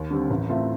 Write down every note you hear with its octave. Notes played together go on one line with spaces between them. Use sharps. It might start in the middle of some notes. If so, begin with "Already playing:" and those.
Already playing: D#2
D3 G3 C4
A1
A2 A3 C4 F4